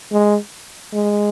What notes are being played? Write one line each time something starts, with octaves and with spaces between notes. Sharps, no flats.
G#3
G#3